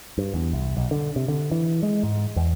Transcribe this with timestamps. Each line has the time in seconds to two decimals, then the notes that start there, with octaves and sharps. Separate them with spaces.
0.18 G2
0.34 E2
0.53 C2
0.77 B1
0.91 D3
1.16 C3
1.28 D3
1.51 E3
1.83 G#3
2.03 G#2
2.36 E2